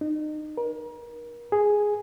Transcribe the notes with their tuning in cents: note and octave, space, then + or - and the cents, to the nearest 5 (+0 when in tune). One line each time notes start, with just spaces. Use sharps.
D#4 -30
A#4 +35
G#4 +0